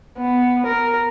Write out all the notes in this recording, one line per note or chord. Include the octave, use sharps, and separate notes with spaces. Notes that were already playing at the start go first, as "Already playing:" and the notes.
B3
A#4